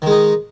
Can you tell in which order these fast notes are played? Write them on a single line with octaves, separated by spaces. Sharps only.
D#3 G#3 D#4